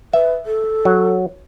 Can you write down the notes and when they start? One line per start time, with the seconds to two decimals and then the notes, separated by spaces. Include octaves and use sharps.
0.13 B4 E5
0.46 A4
0.85 F#3